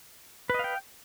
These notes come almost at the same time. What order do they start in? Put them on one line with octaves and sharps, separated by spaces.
B4 D#5 F5 G5